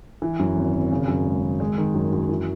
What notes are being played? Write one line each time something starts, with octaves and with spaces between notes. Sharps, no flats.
E3
F#2
G#1
G#1
C#3
F#2
G#3
G#1
G#3
D#3
F#2
F#2
E3